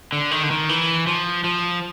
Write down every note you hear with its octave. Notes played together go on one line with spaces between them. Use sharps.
D3
D#3
D3
D#3
E3
F3
F3